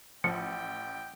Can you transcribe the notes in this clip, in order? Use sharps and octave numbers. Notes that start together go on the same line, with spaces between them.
A1 F3 G5 C#7